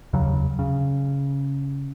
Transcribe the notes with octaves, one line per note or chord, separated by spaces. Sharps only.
F1 D#2 C#3 F#3
C#3